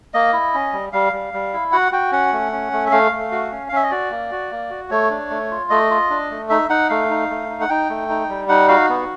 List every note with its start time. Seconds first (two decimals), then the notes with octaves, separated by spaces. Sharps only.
0.14 A#3 D#5
0.33 E4
0.54 C#4
0.73 G3
0.92 G3 F5
1.13 G3
1.33 G3
1.53 E4
1.72 F#4 F#5
1.92 F#4 G5
2.12 C#4 F#5
2.32 A3
2.52 C#4
2.73 A3
2.86 E5
2.92 A3 F5
3.12 A3
3.32 F#4
3.52 C#4
3.69 F5
3.72 C#4 E5
3.83 D#5
3.91 F#4 D5
4.11 A#3
4.31 F#4
4.51 A#3
4.70 F#4
4.90 A3 C#5
5.11 D4
5.30 A3
5.51 F4
5.70 A3 D#5
5.90 F4
6.10 D4
6.30 A3
6.49 D#4 E5
6.70 D#4 F#5
6.90 A3 F5
7.10 D#4
7.30 A3
7.50 D#4
7.61 F#5
7.69 D#4 G5
7.90 A3
8.09 D#4
8.29 G3
8.49 D#4 F#5
8.68 F#4 F5
8.89 B3